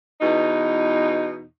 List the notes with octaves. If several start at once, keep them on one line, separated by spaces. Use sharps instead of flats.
E2 B2 D#4